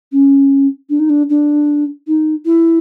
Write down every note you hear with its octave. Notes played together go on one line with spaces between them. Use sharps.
C#4
D4
D#4
D4
D4
D#4
E4